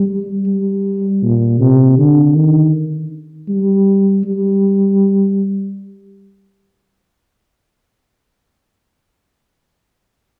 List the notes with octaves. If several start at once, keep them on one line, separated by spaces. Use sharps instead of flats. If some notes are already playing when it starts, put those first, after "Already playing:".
Already playing: G3
G3
A#2
C3
D3
D#3
G3
G3